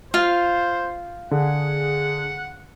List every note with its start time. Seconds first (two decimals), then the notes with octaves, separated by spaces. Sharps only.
0.14 F4 C5 F5
1.31 D3 G#4 F#5